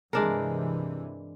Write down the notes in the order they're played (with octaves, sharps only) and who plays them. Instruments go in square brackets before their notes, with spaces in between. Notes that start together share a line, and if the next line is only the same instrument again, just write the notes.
[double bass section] G2 C3 E3 [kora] G#3 D4 A#4